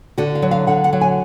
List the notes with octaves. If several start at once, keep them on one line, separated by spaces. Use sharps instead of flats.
D3 F#4
F5
F#3
F5
D3 F#5
F#5
F#3
G#5